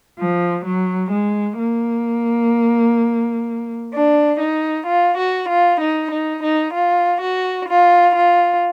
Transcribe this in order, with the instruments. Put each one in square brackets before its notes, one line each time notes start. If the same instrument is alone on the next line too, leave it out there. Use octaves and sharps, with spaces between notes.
[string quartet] F3
F#3
G#3
A#3
D4
D#4
F4
F#4
F4
D#4
D#4
D#4
F4
F#4
F4
F4